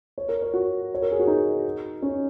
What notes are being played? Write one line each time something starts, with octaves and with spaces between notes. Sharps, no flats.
C#5
A#4
C#5
F#4
C#5
A#4
G#4
F#4
D#4
C#4